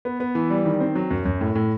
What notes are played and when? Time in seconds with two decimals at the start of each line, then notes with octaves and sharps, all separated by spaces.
0.05 B3
0.20 B3
0.35 E3
0.50 G3
0.65 D#3
0.80 C4
0.95 F#3
1.11 F#2
1.26 F#2
1.41 A2
1.55 A2